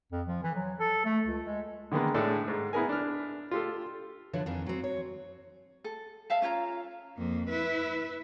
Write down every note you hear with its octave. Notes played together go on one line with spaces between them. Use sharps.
F2
F3
E3
F#3
A4
A3
C#2
G#3
D3 D#3 G#3 A#3 B3
A2 G#3 D4 A4
G#2
B3 E4 G#4 A#4 G#5
D4 F6
F4 G4 A4
D3 E3 F3 B4 C#5
F2 D#3 E3 G#4
F#3 C4
C#5
A4
E5 F5 A5
C#4 F4 C#5 A#5
F2 A#3
E4 B4